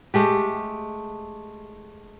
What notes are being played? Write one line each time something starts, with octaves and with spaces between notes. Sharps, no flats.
G#3 A3 G4